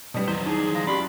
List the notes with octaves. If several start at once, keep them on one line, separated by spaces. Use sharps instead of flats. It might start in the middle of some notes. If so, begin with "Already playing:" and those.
B2 G3 B3
E2 F#3 C5
D#4 G#4
G#3 F5
C#4 F#4 G4 D5 B5 C6